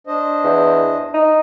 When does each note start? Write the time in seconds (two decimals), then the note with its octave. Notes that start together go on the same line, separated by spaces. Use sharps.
0.07 D4 C5 D#5
0.44 E2
1.14 D#4